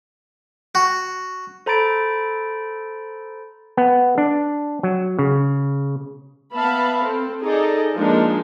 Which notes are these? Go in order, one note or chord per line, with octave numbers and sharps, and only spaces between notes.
F#4
A4 C5 A#5 B5 A6 D7
B3
D4
F#3
C#3
B3 E5 F5 A5 B5
C4 A4
D#4 G#4 A4 D5 D#5
F3 G#3 A#3 D4 D#4